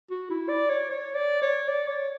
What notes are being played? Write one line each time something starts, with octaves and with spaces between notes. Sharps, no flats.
F#4
E4
D5
C#5
C#5
D5
C#5
D5
C#5